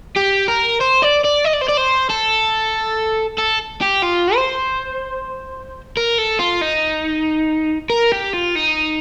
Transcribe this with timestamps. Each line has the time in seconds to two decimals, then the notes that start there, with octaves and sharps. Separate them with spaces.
0.16 G4
0.48 A#4
0.81 C5
1.02 D5
1.24 D5
1.45 D#5
1.53 D5
1.61 C5
1.68 D5
1.77 C5
2.10 A4
3.38 A4
3.82 G4
4.03 F4
4.36 C5
5.97 A#4
6.18 A4
6.39 F4
6.62 D#4
7.90 A#4
8.12 G4
8.33 F4
8.55 D#4